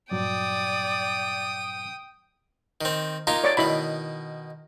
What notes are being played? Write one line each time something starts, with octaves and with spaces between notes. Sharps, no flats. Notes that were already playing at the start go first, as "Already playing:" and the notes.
G2 A#2 F#3 D5 G5 D#6
D#3 C4
A#3 D#4 F4 A#5
C#5 D5 D6
B2 D#3 E4 B5